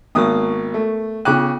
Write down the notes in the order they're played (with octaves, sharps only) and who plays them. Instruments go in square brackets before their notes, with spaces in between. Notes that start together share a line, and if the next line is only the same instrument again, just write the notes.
[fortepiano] G#1 A#3 D#6 [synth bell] B3 A#4 C#6
[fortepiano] A3
[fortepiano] C#3 D6 F#6 [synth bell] B3 F4 G5